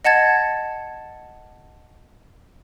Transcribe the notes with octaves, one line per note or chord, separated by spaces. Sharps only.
D#5 F#5 A5 G#6 A6